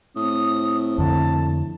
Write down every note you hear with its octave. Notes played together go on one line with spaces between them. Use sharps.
A2 C4 D#6
F2 D3 A5